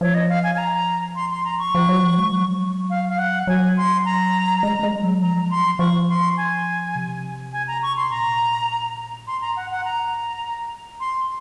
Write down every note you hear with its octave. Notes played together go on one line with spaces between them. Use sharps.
F3 C#5
D#5
F5
G#5
G#5
A#5
C6
C6
A#5
C#6
F3
F#3
F3
G#3
F#3
F5
F5
F#5
F#3 G#5
C6
A#5
G#3
G#3
F#3
F3 A#5
A#5
C6
F3 C#6
C6
G#5
C3
G#5
A#5
C#6
C6
A#2 A#5
G#2 C6
A#5
F#5
F#5
A#5
F#2
G#2
F#2
C6